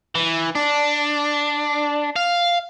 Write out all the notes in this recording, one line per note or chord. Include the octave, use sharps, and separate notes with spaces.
E3
D4
F5